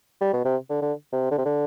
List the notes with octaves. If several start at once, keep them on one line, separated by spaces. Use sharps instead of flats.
G3
B2
C3
D3
D3
C3
D3
C3
D3